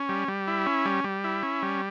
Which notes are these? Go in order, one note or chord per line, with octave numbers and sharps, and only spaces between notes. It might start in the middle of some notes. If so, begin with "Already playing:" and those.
Already playing: C#4
G3
G3
E4
C#4
G3
G3
E4
C#4
G3